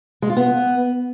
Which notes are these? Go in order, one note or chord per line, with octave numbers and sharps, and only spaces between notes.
G#3
F4
B3